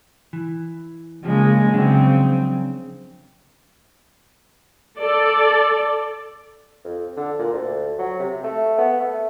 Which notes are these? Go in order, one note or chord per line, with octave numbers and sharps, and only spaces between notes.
E3
C#3 F3 G#3 A#3
C#3 F3 F#3 C4 D4
A4 D5
F2
D3
A#2
D2
F#3
C3
A3
B3
A3